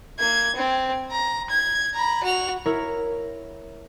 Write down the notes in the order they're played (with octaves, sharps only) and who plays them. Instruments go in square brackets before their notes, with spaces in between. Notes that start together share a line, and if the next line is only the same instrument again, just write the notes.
[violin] A#3 G#6
C4
A#5
G#6
A#5 B5
F#4 F7
[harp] E4 A#4 C#5